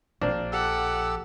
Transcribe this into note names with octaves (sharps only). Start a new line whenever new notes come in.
A#1 A#3 C4 D4
G4 A4 F#5 E6